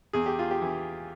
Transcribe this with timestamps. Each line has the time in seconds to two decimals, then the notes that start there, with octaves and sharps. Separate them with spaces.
0.13 E2 G#4
0.26 G4
0.39 F4
0.51 G4
0.62 E3